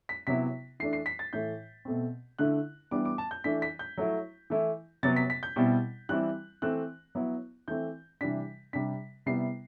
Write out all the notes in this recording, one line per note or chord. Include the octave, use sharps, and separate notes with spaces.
B6
C3 F#3 B3 E4 B6
E3 A3 D4 C7
C7
B6
A6
A2 E3 A3 G6
B2 A3 C4
D3 A3 E4 F#6
E3 G3 B3 D4 D6
D6
A5
G6
E3 A3 D4 B6
B6
G6
F#3 A3 E4
E3 A3 E4
C3 F#3 B3 A6
B6
B6
G6
B2 G3 C4 E4
E3 G3 C4 E4 F#6
E3 A3 C4 F#6
F#3 B3 E4
E3 A3 C4 G6
C3 E3 G3 D4 B6
C3 G3 D4 B6
C3 G3 B3 E4 C7